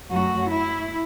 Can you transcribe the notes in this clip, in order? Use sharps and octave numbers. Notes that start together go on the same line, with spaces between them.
F#2 F#3 A3 F#4
E4